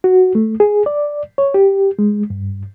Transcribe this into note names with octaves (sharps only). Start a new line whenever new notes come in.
F#4
A3
G#4
D5
C#5
G4
G#3
G2